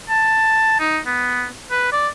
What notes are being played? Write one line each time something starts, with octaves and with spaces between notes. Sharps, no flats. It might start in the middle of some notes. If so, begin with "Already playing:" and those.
A5
D#4
B3
B4
D5